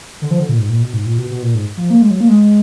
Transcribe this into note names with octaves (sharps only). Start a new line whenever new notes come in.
D3
F3
D3
A#2
G#2
A#2
B2
G#2
A#2
B2
B2
A#2
G#2
F3
A#3
G#3
F#3
A#3
G#3